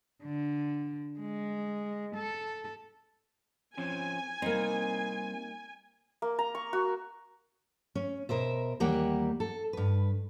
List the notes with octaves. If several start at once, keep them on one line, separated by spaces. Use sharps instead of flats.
D3
G#3
A4
F3 C4 C#4 G#5
G3 A#3 C4 D#4
A#3
A#5
C#6
F#4
C#4
B2 A#4 C5 E5
D#2 E3 G3 A#3 G4 F#5
A4
G2 B4